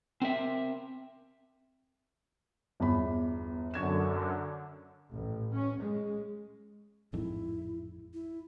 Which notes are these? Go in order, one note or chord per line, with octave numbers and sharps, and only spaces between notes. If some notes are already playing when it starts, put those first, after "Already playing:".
C4 A#4 E5
G1 E2 B5
F#2 D3 C#6 G#6 E7
A1
C#4
G#3
A1 F2 G#2 E4
E4